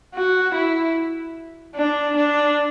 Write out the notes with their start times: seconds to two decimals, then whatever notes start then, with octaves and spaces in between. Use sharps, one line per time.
0.15 F#4
0.54 E4
1.76 D4
2.16 D4